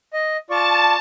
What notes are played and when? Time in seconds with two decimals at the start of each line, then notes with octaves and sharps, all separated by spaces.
0.13 D#5
0.50 F4 D5 A5 C#6